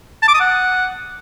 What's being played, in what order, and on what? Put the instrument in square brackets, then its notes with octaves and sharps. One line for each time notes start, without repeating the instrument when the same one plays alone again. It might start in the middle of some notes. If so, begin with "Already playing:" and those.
[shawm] A5
D6
D#6
F#5